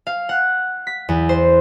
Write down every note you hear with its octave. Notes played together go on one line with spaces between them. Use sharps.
F5
F#5
B6
E2
C5